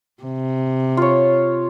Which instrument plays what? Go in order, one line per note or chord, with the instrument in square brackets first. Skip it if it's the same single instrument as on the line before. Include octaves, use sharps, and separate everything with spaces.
[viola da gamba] C3
[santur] F4 C#5